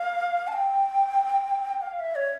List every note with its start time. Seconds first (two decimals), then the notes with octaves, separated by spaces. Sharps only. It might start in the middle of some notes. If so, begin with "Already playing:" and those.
Already playing: F5
0.48 A5
0.53 G5
1.82 F5
1.99 E5
2.15 C#5